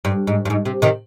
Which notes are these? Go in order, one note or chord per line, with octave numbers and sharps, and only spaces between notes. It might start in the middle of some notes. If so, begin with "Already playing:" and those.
G2
G#2
G2
G#2
C3
C3 D#3